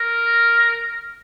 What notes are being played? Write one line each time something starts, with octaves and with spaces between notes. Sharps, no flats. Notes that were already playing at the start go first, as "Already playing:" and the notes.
Already playing: A#4